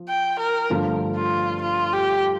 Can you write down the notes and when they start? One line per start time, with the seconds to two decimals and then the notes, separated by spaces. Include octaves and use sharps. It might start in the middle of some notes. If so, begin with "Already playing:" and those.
Already playing: F3
0.09 G5
0.40 A#4
0.70 G2 D3 F3 A3
1.16 F4
1.62 F4
1.93 G4